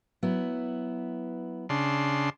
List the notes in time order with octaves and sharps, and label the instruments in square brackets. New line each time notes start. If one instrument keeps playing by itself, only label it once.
[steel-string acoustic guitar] F#3 B3 E4
[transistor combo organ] C#3 D4 C6